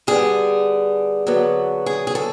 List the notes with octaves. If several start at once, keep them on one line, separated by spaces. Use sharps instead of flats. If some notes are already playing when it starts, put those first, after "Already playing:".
D3 G3 B3 G#4
D3 F#3 B3
G#4
G#4
A4